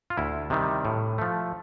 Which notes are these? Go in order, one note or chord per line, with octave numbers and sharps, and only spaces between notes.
F4
D2 E4
C3 D#3 G3
A2
F3 A3